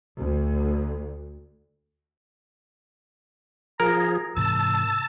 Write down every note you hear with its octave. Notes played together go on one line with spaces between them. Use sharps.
D2
F3 G#4 A#4 A#5
G#2 C3 E3 A5 E6